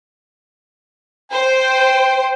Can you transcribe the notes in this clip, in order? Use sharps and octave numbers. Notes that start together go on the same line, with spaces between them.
C5 G5